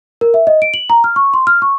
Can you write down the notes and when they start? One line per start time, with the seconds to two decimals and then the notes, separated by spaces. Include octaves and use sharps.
0.21 A#4
0.34 E5
0.47 D#5
0.62 D7
0.74 F#7
0.90 A#5
1.04 F6
1.16 C#6
1.34 C6
1.47 F6
1.62 C#6